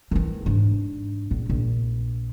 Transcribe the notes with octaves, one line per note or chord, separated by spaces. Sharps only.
D#3 E3
G#2 D4
A#1
A#1